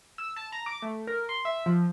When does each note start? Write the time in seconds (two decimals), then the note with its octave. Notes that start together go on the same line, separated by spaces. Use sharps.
0.18 E6
0.36 A5
0.52 A#5
0.66 D6
0.82 A3
1.07 A#4
1.29 C6
1.45 E5
1.66 F3